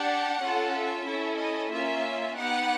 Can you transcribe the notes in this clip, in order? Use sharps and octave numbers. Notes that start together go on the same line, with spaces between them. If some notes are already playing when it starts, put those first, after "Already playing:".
Already playing: D4 G4 F#5
C#4 F4 A4
E5
C#4 E4 A4
D#5
A#3 C#4 F4 E5
B3 D#4 G4 F#5